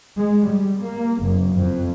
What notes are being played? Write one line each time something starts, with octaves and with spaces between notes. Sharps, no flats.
G#3
G3
A#3
F#1
F2